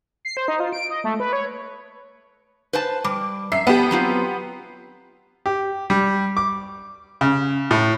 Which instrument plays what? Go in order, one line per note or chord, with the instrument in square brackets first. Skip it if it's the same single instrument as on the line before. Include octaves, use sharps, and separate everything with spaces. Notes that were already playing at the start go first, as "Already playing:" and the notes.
[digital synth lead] C7
C5
D#4
F4
D7
D#5
A3
B4
C#5
[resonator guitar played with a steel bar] B4 C5 A5
[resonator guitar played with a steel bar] G3 [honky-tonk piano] D6
[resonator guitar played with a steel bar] F#2 [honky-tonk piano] E5 C7
[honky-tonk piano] B3 G4 [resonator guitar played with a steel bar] A5
[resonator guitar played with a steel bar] F#3 C4 F4
[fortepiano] G4
G3
D6
C#3
A2